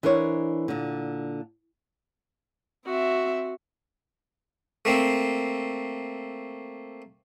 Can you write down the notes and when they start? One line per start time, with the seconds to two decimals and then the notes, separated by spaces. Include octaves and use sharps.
0.03 E3 D4 A#4 C5 C#5
0.68 A#2 D3
2.86 C4 F#4 E5
4.85 A3 A#3 C4